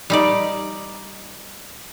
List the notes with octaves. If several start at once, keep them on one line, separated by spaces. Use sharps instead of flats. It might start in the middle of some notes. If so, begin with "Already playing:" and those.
G3 D#4 D5